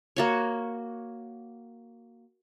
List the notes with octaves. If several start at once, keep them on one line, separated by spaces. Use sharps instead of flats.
A#3 F#4 C#5